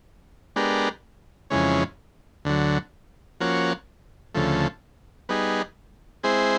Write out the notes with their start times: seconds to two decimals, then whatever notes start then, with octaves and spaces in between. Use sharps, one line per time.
0.56 G#3 B3 D4 G4 A#4
1.50 F2 C#3 E3 G#3 C#4
2.45 D2 D3 F#3
3.40 F3 A#3 C#4 F#4
4.35 D2 C#3 F3 A3
5.29 G3 B3 D#4 G#4
6.23 G#3 C4 E4 G#4 C5